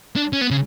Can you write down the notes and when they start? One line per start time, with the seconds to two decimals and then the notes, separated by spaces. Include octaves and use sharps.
0.16 D4
0.33 C#4
0.41 B3
0.51 C#3